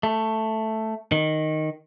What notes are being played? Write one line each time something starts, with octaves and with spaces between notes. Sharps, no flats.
A3
D#3